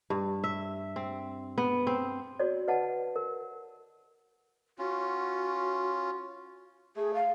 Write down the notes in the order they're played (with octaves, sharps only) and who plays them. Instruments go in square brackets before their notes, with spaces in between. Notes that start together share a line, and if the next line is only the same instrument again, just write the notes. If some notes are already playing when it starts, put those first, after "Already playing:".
[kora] G2
E5
C4
B3
C4
[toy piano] F#4 C#5 D5
B4 D#5 F#5 A5
A#4
[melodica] C#4 F4 [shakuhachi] F#4
[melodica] A3 [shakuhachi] G#4
[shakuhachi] F5